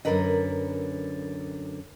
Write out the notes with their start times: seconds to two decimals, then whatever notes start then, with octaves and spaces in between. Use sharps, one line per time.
0.05 F#2 B2 D3 A#4 B4 D#5